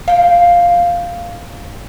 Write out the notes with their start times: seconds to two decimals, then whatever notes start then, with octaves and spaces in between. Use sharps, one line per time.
0.08 F5 G5